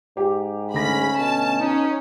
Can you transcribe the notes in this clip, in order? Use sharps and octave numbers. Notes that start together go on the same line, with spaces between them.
G#2 G4
D2 C#4 B5 A#6
B2 A5
C#4 D#4